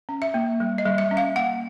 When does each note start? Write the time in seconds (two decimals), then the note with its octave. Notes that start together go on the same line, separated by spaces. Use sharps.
0.09 C#4
0.22 E5
0.34 A#3
0.60 G3
0.78 D#5
0.86 G3
0.98 E5
1.11 C#4
1.17 F5
1.36 A#3 F#5